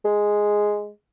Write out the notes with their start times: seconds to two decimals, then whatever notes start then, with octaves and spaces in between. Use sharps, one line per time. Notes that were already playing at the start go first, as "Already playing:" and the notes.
0.05 G#3